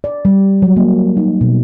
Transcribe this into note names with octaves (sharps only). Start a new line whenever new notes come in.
D5
G3
F#3
A#3
D#4
B2